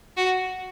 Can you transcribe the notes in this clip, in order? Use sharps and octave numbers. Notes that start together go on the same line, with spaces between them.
F#4